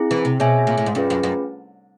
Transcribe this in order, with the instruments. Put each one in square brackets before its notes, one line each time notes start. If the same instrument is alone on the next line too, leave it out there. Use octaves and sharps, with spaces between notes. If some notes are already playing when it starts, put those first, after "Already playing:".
Already playing: [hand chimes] C4 E4 G#4
[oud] E3
C3
[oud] B2 [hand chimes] G#4 C#5 E5 G#5
[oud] A#2
A2
G#2
[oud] G2 [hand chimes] C#4 F4 G#4 B4
[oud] F#2
F#2